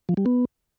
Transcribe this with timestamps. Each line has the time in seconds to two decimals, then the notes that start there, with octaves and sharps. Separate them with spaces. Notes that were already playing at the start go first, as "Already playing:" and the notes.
0.09 F3
0.17 G3
0.26 B3